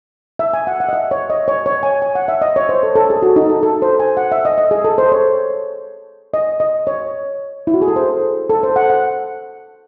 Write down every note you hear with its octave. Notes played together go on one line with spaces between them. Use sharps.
E5
G#5
F#5
F#5
D#5
E5
C#5
D#5
C#5
C#5
G#5
G#5
F#5
E5
D#5
C#5
C5
A4
A4
G#4
F#4
D#4
A4
A4
C5
G#5
F#5
E5
D#5
D#5
G#4
A4
C5
C#5
D#5
D#5
C#5
E4
F#4
G#4
A4
C5
A4
C5
F#5
F#5